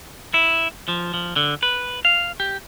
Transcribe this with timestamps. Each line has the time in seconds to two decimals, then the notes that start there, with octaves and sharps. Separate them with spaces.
0.34 E4
0.88 F3
1.14 F3
1.36 D3
1.63 B4
2.05 F5
2.40 G4